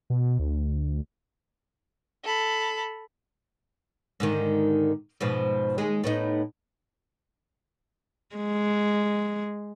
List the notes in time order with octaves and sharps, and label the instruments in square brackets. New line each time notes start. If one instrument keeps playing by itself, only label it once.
[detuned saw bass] B2
D2
[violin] A4 B5
[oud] G#2 D3 D#3
G#2 B2 F3
D#2 G#3 G#4
A2 B3 D#4
[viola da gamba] G#3